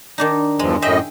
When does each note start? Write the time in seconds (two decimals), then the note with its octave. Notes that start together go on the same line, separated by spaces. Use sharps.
0.18 D#3 D4 D#4
0.59 E2 G2 F3 G#3
0.82 F#2 A2 G#4 D#5 E5 G5